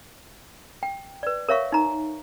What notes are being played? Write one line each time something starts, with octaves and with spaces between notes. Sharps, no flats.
G5
B4 D5
A#4 C#5 E5 F5 C#6
D#4 A#5